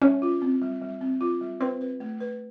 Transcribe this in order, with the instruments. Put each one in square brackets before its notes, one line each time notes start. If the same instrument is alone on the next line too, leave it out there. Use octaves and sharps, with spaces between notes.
[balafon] G3 [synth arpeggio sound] C#4
[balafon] F4
C4
G3
G3
C4
F4
G3
[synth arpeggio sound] C4 [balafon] B4
[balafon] B4
A3
B4